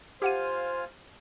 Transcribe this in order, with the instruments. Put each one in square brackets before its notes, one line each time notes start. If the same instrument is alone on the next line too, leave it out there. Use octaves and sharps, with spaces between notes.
[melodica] F4 F5 G#5 [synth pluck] G4 F#5 D#7 [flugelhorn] C5